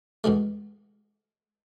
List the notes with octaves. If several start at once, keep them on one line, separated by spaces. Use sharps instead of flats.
E2 B2 G#3 A3